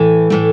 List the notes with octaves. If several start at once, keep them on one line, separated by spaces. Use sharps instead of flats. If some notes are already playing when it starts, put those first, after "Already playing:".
Already playing: A2 E3 A3
A2 E3 A3